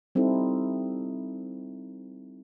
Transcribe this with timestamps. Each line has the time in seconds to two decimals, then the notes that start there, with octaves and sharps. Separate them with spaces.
0.15 G3 C4 D#4 E4 A4